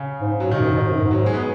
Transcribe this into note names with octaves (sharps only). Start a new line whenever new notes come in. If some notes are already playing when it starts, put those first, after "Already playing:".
Already playing: C#3
G#2
F#3
G#2
B2 D#3
F#2
G#2
B2
G#2
F#2
G#2
F#3
G#3
B3